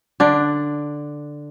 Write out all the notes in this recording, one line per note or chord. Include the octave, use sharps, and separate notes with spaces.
D3 D4